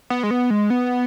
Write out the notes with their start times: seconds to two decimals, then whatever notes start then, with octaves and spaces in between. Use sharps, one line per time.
0.10 B3
0.23 G#3
0.31 B3
0.50 G#3
0.70 B3